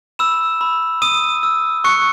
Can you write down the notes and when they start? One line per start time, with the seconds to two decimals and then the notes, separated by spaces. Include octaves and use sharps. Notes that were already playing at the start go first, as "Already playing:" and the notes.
0.19 B5 E6 E7
0.61 B5
1.02 D#6 E6 D#7
1.43 E6
1.84 C#6 F#6 C#7